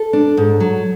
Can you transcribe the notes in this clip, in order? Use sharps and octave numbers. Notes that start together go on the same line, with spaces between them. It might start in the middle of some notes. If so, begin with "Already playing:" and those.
Already playing: A4
D4
G#2
F#3